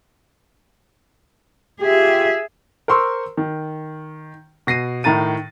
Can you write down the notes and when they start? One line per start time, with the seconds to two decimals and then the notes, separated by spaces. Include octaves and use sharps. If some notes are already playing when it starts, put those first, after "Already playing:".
1.81 F4 G4 G#4 E5
2.88 A#4 C5 C6 C#6 E6
3.37 D#3
4.67 B2 A#6 C7 D#7
5.04 A2 D#3 A#5 A6 D#7